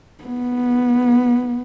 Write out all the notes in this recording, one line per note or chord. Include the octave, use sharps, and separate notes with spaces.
B3